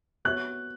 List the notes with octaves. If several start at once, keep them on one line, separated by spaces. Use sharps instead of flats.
B3 F#4 C#5 E5 F#6